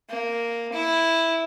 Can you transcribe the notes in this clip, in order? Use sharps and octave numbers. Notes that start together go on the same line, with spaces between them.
A#3
E4